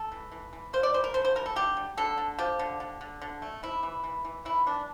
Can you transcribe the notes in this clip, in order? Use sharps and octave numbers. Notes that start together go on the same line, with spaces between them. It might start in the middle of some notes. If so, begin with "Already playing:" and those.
Already playing: A4
E3
E3
E3
A#3 C5
D5
E3 C5
A#4
D3 C5
C5
G3 A#4
A4
D3 G4
G3
D3 A4
D3
F3 G4
D3
D3
D3
D3
A3
C3 E4
E3
E3
E3
E3 E4
E3 D4